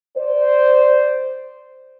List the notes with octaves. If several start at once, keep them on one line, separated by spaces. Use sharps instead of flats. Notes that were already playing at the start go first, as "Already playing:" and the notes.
C5 D5